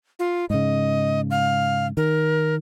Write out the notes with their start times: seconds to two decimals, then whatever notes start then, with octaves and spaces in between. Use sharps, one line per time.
0.19 F4
0.50 G#2 C#3 D#5
1.31 F5
1.97 D#3 A#4